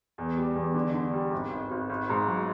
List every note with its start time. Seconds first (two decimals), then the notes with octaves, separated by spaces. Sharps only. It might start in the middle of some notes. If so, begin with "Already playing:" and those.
0.18 E2
0.37 G3
0.55 E2
0.74 D3
0.94 D3
1.13 G3
1.32 G#1
1.51 G#1
1.71 G#1
1.90 G#1
2.09 G#2
2.28 F#3